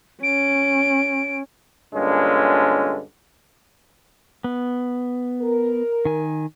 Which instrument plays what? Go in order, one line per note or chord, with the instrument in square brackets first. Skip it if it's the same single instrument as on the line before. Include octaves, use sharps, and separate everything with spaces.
[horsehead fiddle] C#4 [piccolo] D7
[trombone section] G2 A#2 D3 G#3 C#4
[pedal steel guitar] B3
[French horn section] A#4
[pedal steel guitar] D#3 G#5